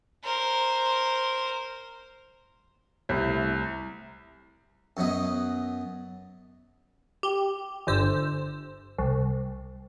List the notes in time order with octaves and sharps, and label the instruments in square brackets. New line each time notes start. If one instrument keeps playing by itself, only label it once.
[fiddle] A#4 C5
[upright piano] C2 [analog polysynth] A3 E4 E5
[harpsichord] F#2 F#3 B3 D#5
[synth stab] G4
G1 D3 C5 E6
C2